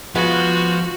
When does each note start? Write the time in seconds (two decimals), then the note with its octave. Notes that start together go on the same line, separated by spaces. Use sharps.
0.15 F3 G#3 B3 F4 F#4